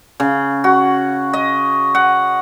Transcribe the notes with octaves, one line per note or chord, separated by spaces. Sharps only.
C#3
F#4
D#5
F#5